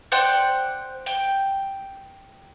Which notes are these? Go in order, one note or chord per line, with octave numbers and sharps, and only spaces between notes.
C5 D5 F#5 G5
G5